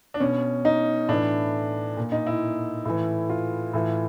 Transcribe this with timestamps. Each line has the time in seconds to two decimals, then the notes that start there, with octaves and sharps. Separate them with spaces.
0.14 D4
0.20 B2 C#4
0.65 D#4
1.09 A2 E3 D4
1.97 A#2
2.12 D#4
2.27 E4
2.85 A2 E3
3.30 F4
3.74 A2 E3